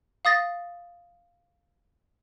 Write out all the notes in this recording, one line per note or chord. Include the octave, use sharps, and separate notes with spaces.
F5 D#6 A6 A#6